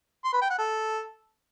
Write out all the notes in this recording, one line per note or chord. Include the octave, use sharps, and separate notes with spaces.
C6
B4
G5
F#5
A4